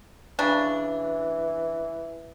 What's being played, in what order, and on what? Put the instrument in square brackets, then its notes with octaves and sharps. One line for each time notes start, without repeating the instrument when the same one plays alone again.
[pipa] C#3 D4 [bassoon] E3